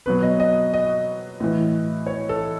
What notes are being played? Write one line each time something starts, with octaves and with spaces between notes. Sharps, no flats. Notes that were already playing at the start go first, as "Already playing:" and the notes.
B2 F#3 B4
D#5
D#5
D#5
A2 E3
C#5
A4